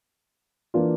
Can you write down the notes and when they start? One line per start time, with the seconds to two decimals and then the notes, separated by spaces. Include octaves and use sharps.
0.74 E3 A#3 D4 F4